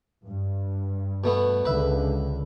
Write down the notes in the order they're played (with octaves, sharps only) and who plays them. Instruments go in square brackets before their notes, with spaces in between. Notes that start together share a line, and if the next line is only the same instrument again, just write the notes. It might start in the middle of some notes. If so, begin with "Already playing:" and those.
[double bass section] G2
[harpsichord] B2 A3 B3
[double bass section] C#2 D3 [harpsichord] B4 E5